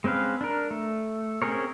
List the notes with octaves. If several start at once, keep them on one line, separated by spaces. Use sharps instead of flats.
G#3 C4 C#4 B4 F5
D4 A#4
A3
C4 C#4 G#4 A#4 C#5